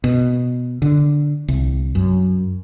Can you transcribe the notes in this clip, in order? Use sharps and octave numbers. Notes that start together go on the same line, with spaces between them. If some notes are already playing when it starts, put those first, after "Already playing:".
B2
D3
C2
F#2